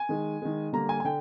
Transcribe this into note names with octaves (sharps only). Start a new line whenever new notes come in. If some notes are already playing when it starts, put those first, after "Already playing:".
Already playing: G#5
D#3 G#3
D#3 G#3
D3 G3 A#3 A#5
G#5
G#5
D3 G5